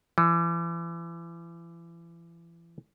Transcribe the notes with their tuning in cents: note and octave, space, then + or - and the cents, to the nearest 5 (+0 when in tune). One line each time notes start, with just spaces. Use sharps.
E3 +35